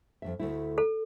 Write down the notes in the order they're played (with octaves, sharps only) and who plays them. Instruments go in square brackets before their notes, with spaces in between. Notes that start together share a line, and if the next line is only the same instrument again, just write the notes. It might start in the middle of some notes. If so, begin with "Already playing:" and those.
[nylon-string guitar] F2 B2 E5
D2 A3 E4
[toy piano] A4